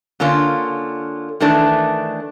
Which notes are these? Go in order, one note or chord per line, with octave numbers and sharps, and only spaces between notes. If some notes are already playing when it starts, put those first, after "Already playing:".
D3 A#3 C#4 F4
D#3 E3 A3 D4